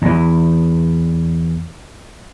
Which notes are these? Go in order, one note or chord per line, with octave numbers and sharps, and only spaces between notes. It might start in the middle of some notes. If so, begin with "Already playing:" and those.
E2 E3